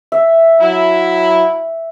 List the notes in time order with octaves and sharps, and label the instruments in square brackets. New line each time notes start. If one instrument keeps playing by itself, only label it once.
[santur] E5
[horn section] F#3 E4